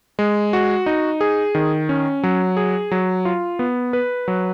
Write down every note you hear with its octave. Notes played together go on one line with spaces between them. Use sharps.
G#3
F#4
D#4
G#4
D#3
C#4
F#3
G#4
F#3
F4
B3
B4
F#3